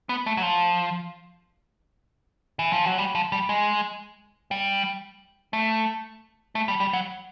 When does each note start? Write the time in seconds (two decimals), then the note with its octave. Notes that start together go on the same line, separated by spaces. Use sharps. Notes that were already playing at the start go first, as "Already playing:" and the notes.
0.09 B3
0.26 A3
0.37 F#3
0.43 F3
2.59 E3
2.72 F3
2.85 F#3
2.98 G3
3.15 F3
3.32 G3
3.49 G#3
4.51 G3
5.53 A3
6.55 A3
6.68 G3
6.80 G3
6.93 F#3